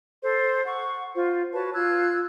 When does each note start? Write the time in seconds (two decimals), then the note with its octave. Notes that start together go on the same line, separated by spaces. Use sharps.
0.23 A4 C5
0.65 F#5 C#6
1.14 F4 C5
1.53 F#4 B4 C#5 A5
1.74 F4 E6 F#6 G#6